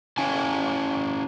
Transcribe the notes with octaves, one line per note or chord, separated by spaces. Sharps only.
C#4 E4 F5 G#5 A5